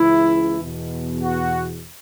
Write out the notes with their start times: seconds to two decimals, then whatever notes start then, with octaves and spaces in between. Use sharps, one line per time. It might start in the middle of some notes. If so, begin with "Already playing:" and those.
Already playing: C#2 C#3 E3 E4
0.60 E2 B2
1.23 F#4